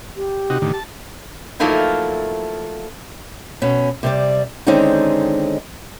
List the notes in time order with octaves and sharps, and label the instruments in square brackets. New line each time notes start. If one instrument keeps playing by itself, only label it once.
[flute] G4
[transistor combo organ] C3 D#4 F#4
A2 D3 D#3
A5
[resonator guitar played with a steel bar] F3 F#3 A3 A#3 D#4 E4
[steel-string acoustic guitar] B2 C#4
C3 G3 D5
D3 D#3 G#3 C4 C#4 D#4